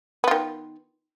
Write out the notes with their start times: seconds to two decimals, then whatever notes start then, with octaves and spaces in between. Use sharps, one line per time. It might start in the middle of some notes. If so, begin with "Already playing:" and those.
0.24 B3
0.28 F4
0.31 D#3